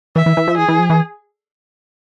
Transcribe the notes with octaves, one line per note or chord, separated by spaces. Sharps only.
E3 E5
E3
E3
F3
E3 G#4
E3
F3
E3